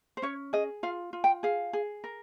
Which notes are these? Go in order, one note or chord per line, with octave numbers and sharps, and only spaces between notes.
C5
C#4 C#5
G#4 D#5
F4 F5
F4
G5
G#4 F5
G#4
A#4